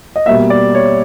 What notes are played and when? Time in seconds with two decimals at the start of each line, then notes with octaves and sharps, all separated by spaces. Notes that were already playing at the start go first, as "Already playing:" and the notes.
0.16 D#5
0.26 B2 G3 A#3 E5
0.50 D5
0.75 C#5